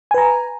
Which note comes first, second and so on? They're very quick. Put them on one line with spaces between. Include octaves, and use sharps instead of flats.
G#5 B4 A#5